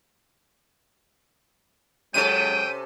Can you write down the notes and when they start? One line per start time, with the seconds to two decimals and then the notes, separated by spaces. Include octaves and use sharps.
2.14 C3 F#3 G#3 C#4 A4 G5 D#7